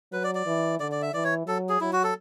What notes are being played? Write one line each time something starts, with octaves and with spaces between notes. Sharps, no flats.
F#3 B4
D5
D5
E3
D3 D5
D5
E5
E3 D5
C#5
F#3 A4
G#4
F#3 E4
F#4
A4